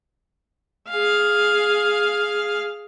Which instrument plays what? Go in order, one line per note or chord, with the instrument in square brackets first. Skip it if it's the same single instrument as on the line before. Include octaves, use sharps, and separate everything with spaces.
[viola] G#4 F5